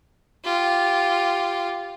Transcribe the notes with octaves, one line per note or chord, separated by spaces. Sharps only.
F4 G4